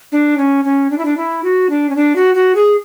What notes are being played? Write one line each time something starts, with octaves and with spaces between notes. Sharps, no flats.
D4
C#4
C#4
D4
E4
D4
E4
F#4
D4
C#4
D4
F#4
F#4
G#4